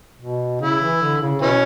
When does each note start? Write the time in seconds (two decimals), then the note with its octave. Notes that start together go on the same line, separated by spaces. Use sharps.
0.21 B2
0.61 C#3 E4
0.81 E3
1.01 D3
1.22 C#3
1.41 B2 E3 C#4